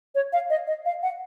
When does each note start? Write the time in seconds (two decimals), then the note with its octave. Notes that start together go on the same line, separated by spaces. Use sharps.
0.15 C#5
0.33 F5
0.50 D#5
0.67 D#5
0.85 F5
1.03 F#5